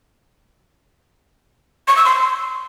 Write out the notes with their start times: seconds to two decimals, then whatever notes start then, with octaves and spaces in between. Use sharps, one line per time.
1.88 C#6
1.96 E6
2.05 C6